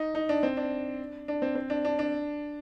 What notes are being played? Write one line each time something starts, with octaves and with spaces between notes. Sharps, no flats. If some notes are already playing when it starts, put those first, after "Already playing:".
Already playing: D#4
D#4
D4
C4
D4
D4
C4
C4
D4
D4
D4